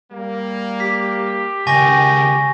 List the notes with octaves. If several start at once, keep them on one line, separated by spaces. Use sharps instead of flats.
G3 A#3
G4 B6
C#2 D#3 D#5 G5 G#5 C#6 A#6